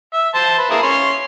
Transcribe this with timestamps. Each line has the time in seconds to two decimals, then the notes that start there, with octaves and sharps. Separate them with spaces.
0.13 E5
0.35 C5 A5
0.58 B4
0.70 A#3 E4 G#4
0.83 C#4 C6